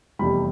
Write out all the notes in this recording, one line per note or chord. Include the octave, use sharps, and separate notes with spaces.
F1 E2 C3 G3 B5